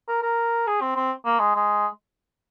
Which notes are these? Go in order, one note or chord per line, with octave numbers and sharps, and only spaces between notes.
A#4
A#4
G#4
C4
C4
A#3
G#3
G#3